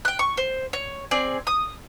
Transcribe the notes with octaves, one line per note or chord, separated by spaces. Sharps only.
G5 F#6
C#6
C5
C#5
C4 G#4 D5
D#6